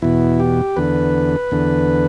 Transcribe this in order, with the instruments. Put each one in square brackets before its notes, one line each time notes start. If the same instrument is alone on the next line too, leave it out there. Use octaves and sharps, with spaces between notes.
[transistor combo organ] E2 B2 E4
G4
E2 D3 B4
E2 D3